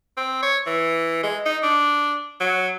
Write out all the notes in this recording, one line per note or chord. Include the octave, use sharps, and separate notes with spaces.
C4
C#5
E3
G#3
D#4
D4
F#3